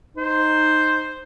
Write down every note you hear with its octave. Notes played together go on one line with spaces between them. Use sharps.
D#4 C5